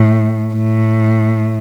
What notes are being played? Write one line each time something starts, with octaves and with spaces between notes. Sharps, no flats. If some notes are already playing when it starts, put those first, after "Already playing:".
Already playing: A2
A2